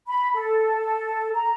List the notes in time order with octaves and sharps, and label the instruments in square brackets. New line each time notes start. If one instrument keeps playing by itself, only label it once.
[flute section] B5
A4
A#5